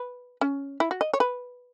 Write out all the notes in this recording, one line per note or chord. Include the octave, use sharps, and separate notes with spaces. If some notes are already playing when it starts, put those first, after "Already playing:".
Already playing: B4
C#4
E4
F#4
D#5
C#5
B4